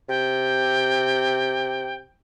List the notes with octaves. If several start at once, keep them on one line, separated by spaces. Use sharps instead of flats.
C3 G5